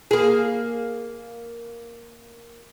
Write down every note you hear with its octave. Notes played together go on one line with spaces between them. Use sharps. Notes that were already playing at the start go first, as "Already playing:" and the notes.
A#3 G#4